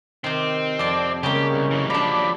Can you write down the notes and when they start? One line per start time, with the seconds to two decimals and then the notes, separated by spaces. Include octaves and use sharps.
0.24 C3 D#3 C4
0.79 F2 D5 A5
1.23 C#3 G3 G#3 A#3 G4
1.54 C2
1.71 F#2 E3
1.90 F3 F#3 D4 D5 A#5 B5